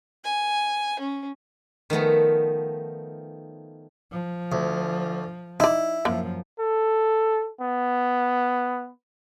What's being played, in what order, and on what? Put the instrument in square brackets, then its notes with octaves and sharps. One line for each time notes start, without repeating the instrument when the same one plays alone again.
[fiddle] G#5
C#4
[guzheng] D#3 F3 A3 B3
[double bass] F3
[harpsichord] D2
[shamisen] D#4 D5 [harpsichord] E4
[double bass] F#2 F3 [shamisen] A#3
[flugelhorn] A4
B3